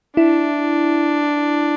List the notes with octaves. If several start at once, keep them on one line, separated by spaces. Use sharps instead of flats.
D4 E4